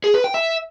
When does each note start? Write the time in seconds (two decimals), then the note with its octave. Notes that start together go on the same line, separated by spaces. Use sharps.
0.04 G#4
0.14 B4
0.24 G5
0.34 E5